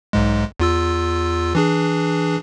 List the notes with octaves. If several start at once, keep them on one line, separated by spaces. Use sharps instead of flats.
B1 G#2 G#3
E2 F4 E6
E3 D4 G#4